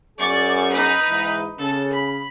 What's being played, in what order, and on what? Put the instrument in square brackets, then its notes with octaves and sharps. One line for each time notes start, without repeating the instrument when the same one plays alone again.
[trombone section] F#2 G#4 [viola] D5 C#6
[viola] D#4 B4
[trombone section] G#2 E3
[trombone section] C#3 [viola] A4
[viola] B5